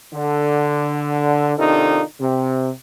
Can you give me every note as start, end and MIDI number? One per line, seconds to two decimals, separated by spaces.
0.14 1.54 50
1.58 2.02 48
1.58 2.02 51
1.58 2.02 62
1.58 2.02 63
1.58 2.02 65
1.58 2.02 69
2.21 2.71 48